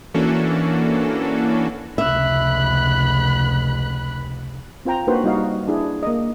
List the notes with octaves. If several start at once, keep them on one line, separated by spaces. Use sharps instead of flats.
E3 A#3 C#4 D4 F#4 A4
F1 C#2 E5 B5 F#6
C4 F4 C5 G5 A#5
A#3 D4 D#4 F#4 B4 C5
G3 D#4 F#4 D#5 F5
D4 E4 G#4
A#3 D#5